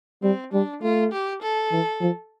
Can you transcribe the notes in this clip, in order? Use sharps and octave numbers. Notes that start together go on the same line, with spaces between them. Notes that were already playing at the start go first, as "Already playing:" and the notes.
G3 C4
G3 D4
A3 F4
G4
A4
E3
F3